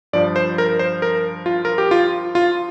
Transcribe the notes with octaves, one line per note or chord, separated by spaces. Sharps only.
G2 F3 D5
C5
A#4
C5
A#4
F4
A#4
G4
F4
F4